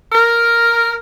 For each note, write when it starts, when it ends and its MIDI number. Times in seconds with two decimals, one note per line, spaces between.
0.12 0.97 70